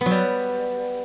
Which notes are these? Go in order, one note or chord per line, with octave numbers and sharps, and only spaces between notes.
B3
F#3
G3